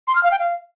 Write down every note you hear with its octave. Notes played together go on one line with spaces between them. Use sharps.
C6
F6
F5
G5
F5